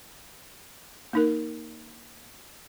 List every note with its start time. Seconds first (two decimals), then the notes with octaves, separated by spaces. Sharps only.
1.13 A#3 D#4 A#4